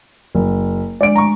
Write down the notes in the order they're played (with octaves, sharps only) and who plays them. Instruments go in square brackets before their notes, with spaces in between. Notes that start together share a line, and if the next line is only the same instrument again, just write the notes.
[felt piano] F#1
[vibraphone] G#3 D4 [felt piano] D5 D7
[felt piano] A#5 C#6